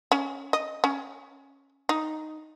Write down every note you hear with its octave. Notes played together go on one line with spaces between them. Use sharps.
C#4
D#5
C#4
D#4